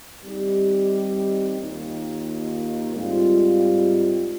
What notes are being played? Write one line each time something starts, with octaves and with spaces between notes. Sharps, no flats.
D#3 G3 C4 D#4 G4
D#2 D#3 A#3 F4
G#2 G3 C4 F4